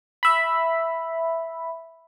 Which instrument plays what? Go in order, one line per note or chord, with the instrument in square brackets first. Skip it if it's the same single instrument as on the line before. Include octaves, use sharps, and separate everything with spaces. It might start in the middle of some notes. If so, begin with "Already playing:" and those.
[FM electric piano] E5 B5